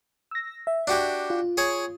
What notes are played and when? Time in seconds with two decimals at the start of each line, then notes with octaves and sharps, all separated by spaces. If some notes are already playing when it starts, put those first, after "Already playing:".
0.31 E6 A#6
0.67 E5
0.87 D4 F#4 G4
1.30 F4
1.57 G#4 C#5 A5